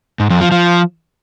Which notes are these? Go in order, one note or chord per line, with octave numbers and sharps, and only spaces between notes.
G#2
F2
F3
F3